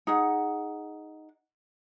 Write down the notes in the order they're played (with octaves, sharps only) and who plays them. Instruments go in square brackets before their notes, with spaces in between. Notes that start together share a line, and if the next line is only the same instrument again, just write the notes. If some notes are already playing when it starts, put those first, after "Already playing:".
[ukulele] D#4 G#4 F#5